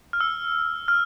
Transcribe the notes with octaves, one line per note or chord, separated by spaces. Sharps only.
F6
E6
F6